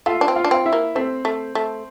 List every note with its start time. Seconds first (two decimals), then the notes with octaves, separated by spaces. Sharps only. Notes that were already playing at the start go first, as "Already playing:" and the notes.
0.06 A3 F4 F5
0.21 D4
0.28 C4
0.36 F4 F5
0.44 D4
0.51 C4 F5
0.66 E4 E5
0.73 A#3
0.95 A3 C4 C5
1.25 A3
1.55 A3